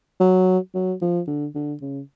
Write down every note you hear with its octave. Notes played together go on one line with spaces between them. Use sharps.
F#3
F#3
F3
D3
D3
C#3